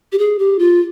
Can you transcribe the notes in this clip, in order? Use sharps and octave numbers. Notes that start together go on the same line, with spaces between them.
G4
G#4
G4
F4